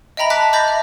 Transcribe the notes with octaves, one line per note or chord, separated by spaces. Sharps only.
D#5 E5 G5 A#5 B5 A#6
A5 D6 F#6 B6
D#5 B5 D6 G6 A6 A#6
E5